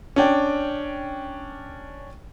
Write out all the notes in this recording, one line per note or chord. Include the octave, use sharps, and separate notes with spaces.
C#4 D4 G5